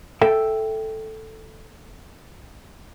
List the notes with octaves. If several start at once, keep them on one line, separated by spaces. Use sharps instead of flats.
A4 E5 G5